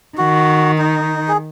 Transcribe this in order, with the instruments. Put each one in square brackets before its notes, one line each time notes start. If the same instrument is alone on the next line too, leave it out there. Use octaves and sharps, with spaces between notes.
[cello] D#3 [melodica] F#4
[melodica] D#4
G#4